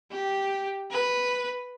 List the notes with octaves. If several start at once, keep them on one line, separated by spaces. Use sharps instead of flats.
G4
B4